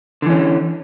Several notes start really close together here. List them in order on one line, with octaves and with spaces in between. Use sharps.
D3 E3 C#4